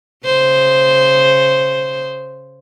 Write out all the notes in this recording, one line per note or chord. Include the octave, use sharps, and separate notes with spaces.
C#3 C5